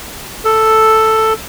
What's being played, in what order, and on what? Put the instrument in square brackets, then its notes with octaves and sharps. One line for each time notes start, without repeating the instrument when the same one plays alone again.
[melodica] A4